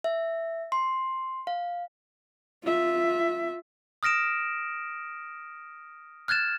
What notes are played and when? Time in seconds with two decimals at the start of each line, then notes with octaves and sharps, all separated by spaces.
0.04 E5
0.72 C6
1.47 F5
2.63 F4 E5
4.03 D#6 F6 A#6 D7 E7
6.28 F6 F#6 G#6 A6 E7